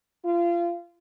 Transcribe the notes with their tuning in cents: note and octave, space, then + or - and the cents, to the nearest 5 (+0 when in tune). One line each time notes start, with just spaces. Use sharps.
F4 -25